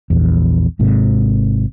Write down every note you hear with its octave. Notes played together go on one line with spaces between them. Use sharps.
A#1 E2
G#1 G#2 C3